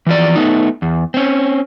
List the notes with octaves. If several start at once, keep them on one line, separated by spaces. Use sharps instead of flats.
E3 F3 D5
A3 B3 D#4
E2
C4 C#4